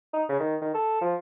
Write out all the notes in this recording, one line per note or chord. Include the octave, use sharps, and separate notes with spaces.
D#4
C#3
D#3
D#3
A4
F3